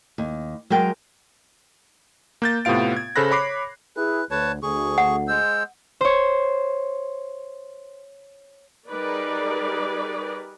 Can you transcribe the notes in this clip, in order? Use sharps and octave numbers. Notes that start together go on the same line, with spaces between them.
D#2
F#3 G#3 A#4 G5
A#3 G6 A6
A2 C3 B3 F4 F5 D7
G#6
C#3 A4 C5 B5 F#6 A#6
C#5 B5 D6 C7
E4 G#4 B4
D2 B4 C#5 A5
D2 G#4 C#6
F#5
G#3 C5 E6
C5 C#5
G3 D#4 G#4 A#4 B4 D5